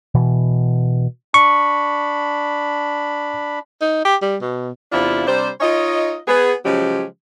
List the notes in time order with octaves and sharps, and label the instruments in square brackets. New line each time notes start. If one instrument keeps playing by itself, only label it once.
[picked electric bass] B2 E3
[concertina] D4 B5 [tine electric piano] C#6
[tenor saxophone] D#4
G4
G3
B2
[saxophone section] E2 C3 D4 E4 F4
C3 G3 D4 C5
D#4 F4 C#5 D#5
B3 G#4
C#3 F3 F#3 G#3 C#4 G4